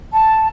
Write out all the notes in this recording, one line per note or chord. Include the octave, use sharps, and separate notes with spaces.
A5